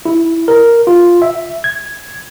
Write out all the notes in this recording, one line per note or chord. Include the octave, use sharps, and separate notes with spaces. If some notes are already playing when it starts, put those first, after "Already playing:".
E4
A#4
F4
E5
G#6